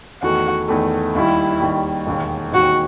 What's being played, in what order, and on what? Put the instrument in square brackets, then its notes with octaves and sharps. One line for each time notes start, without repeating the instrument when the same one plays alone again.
[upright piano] E2 D#3 A3 [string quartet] F#4
[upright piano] E2 D#3 A3
[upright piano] D#2 D#3 G3 [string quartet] E4
[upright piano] D#2 D#3 G3
E1 D#2 D#3
[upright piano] E1 D#2 D#3 [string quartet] F#4